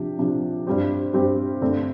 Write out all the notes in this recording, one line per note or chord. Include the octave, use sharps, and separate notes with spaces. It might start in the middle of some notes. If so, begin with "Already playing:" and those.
Already playing: C3 F3 D4 G4
C3 F3 D4 G4
G2 G3 C4 G4 C5
G2 G3 C4 G4 C5
G2 D3 A3 C4